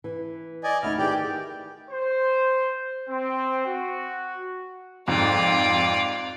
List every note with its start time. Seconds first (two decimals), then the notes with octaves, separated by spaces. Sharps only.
0.04 E3
0.64 D5 D#5 G#5
0.83 D2 D#4 E4 F6
0.99 D#3 E3 G4 G#4 D5 G5
1.90 C5
3.09 C4
3.66 F#4
5.08 F2 G#2 F4 D5